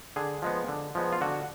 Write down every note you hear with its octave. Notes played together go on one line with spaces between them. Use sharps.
D3 G#4
F3 G#3 B3
D3
F3 G#3 B3
F4
D3 F#4